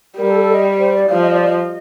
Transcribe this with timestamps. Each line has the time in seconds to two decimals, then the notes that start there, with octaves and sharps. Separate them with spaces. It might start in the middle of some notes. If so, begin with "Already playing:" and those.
0.18 G3 A#4
0.29 A4
0.40 A4
0.52 D#5
0.79 C5
0.94 D5
1.09 F3 F5
1.22 D#5
1.33 D5
1.45 D#5